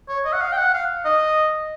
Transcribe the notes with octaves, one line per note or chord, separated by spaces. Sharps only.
C#5
D#5
F#5
F5
G5
F#5
F5
D#5